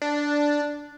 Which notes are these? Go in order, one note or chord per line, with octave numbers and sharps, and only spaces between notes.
D4